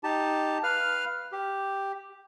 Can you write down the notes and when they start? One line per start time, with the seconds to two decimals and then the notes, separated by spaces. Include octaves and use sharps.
0.04 D#4 G4 A5
0.63 B4 F5 F6
1.32 G4